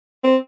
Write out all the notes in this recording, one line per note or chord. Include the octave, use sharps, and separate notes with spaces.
C4